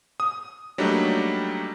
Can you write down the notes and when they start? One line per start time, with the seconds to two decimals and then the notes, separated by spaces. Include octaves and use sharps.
0.20 D#6
0.78 F#3 G3 A3 A#3 D4 D#4